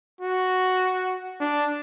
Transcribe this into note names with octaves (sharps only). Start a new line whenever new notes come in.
F#4
D4